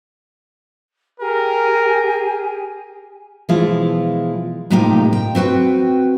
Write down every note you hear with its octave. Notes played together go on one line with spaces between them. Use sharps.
G4 G#4 A#4 G#5
B2 E3 F3 G#3 E4 F4
A2 C3 A#3 D#4 F4 G4
G5
C4 F#4 B4 G5